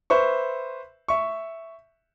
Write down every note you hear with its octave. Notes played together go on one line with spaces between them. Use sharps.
B4 C5 E5 C#6
E5 C#6